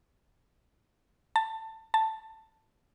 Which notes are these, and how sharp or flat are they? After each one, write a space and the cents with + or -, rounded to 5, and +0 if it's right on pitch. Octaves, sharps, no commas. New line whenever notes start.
A5 +15
A5 +5